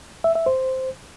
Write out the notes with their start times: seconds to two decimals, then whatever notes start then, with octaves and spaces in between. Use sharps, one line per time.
0.24 E5
0.35 E5
0.46 C5